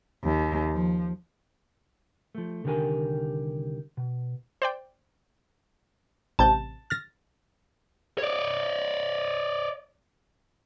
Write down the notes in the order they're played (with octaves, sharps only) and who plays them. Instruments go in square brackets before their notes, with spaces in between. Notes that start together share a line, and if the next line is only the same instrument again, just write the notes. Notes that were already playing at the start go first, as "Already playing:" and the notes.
[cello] D#2
F3
[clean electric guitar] F3 A3
C2 D3 D#3 G4 A#4 G#5
B2
[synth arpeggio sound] C5 D5 G5
[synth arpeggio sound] A1 C3 G6 [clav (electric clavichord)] A5
[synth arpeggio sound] F6 A6 A#6
[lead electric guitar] C#5 D5